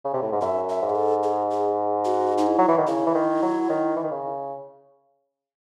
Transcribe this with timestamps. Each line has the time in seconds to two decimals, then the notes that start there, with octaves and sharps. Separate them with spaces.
0.05 C#3
0.14 C3
0.22 A2
0.32 G#2
0.41 F#2 E5
0.69 E5
0.82 G#2
0.90 G#4
0.95 A4
1.23 G#4
1.51 G#4
2.05 F#4
2.38 D#4
2.47 E4
2.58 F#3
2.68 E3
2.77 D#3
2.87 C#3 E4
3.07 E3
3.15 D#3
3.42 F#3
3.69 D#3
3.96 E3
4.03 D#3
4.11 C#3